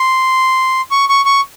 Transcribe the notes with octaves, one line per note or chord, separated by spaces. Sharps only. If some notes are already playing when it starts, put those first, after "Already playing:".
Already playing: C6
C#6
C#6
C#6